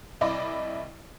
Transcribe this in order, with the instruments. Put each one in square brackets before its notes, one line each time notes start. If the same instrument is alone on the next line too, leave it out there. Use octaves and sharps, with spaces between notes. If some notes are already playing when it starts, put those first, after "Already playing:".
[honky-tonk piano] C2 E4 D5 D#5 B5